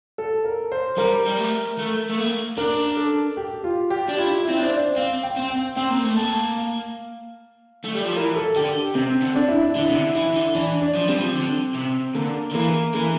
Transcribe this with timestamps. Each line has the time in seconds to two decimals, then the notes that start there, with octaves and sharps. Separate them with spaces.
0.18 A4
0.45 A#4
0.72 C5
0.97 G3 A#4
1.26 G3
1.38 A3
1.78 A3
2.09 A3
2.18 A#3
2.57 D4 A#4
2.97 A4
3.37 G4
3.64 F4
3.90 G4
4.09 D4
4.17 E4 F4
4.44 C4 E4
4.57 D4
4.63 C5
4.70 D5
4.96 C4 F5
5.23 G5
5.37 C4
5.50 G5
5.76 C4 G5
5.90 A#3
6.03 A3
6.17 A#3 A5
6.56 F5
7.84 A3
7.94 G3
8.05 F3
8.16 E3 A#4
8.36 A4
8.56 D3 G4
8.95 C3 C4
9.22 D3
9.35 D4
9.49 E4
9.62 D4
9.75 D3 E4
9.88 C3
9.95 D3
10.15 E3 E4
10.36 D3
10.55 E3 D4
10.81 D4
10.95 F3
11.08 G3 C4
11.20 F3
11.35 D3
11.75 C3
12.15 D3 A#3
12.51 D3
12.54 E3 A#3
12.94 E3 A#3